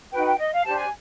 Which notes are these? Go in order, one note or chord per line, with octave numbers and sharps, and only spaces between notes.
D#4 F#4 B4 G5
G5
D#5
F5
D4 G4 C5 A5
G#5